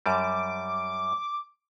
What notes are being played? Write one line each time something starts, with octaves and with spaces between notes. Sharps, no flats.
F#2 G3 D6